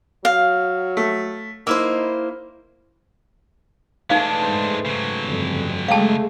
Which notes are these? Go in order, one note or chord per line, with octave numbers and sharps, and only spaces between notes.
F#3 F5
A3
A#3 D#4 E4 C5 E6
E3 G#3 A3 D4 D#4 F5 D6
G#2 C5
C#3 F#3
G1 F2
G#3 A3 F5 G5 A5